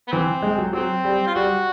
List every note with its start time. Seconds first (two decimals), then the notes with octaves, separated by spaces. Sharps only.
0.08 B3
0.12 E3 C4
0.42 G#3
0.58 F#3
0.73 F#3 C4
1.05 G3
1.27 F4
1.35 G3 F#4